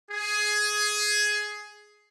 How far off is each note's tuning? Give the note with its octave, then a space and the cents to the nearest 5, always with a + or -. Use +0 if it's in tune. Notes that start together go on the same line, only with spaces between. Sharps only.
G#4 +10